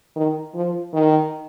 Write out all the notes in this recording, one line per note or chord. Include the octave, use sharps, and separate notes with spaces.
D#3
F3
D#3